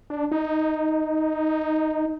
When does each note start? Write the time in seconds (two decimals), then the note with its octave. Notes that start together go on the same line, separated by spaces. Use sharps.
0.10 D4
0.31 D#4